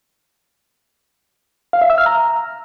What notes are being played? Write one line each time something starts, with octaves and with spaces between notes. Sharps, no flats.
F5
E5
E6
F6
A#5